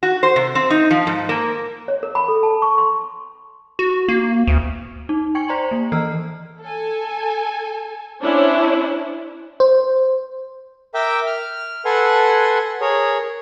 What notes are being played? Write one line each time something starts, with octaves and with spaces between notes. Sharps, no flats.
F#4
C5
C3
C4
D#4
F3
G#2
A#3
C#5
A#4
B5
A4
A5
C#6
C6
F#4
A#3
D2
D#4
G5 G#5 C#6 G#6 C#7
C5 D5 A#5 C6 F#7
A#3
E3 A4 A#5 E6 F6 C7
A4 G#5
C#4 D4 E4 C5 C#5
C5
A#4 E5 G5 D6
F6
A4 B4 F#5 G#5 C6
G#4 A#4 C#5